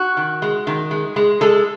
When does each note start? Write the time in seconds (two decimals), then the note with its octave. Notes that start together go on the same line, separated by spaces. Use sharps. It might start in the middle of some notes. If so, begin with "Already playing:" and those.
Already playing: F#4
0.17 D#3
0.42 G#3
0.67 D#3
0.91 G#3
1.16 G#3
1.41 G#3 A4